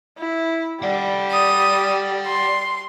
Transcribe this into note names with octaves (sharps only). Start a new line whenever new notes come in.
E4
G3 D5 F#5
D#6
C6